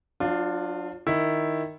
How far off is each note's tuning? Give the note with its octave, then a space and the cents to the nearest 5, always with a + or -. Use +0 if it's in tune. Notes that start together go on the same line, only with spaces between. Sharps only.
F#3 -35 D4 +15 F4 +0
D#3 +0 E4 +0